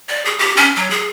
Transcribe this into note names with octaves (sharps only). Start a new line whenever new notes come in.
D5
G#4
G4
C#4
F#3
G#4